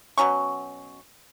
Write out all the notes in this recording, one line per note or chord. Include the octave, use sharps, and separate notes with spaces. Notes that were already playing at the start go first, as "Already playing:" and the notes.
B2 F#3 C#4 C#6